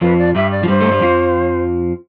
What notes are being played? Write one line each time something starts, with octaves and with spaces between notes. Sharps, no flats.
F2 F3 B4
D5
G2 G3 E5
D5
F3
G2 G3 C5
A3
G3
F2 F3